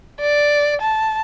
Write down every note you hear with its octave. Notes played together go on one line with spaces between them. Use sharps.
D5
A5